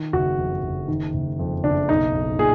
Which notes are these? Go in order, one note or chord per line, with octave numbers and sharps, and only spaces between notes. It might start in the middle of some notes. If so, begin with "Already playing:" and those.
Already playing: D#3
F#1 F#4
F2
F#1
D#3
F#1
F2
F#1 D4
B1 D#4
B1
A#2 G#4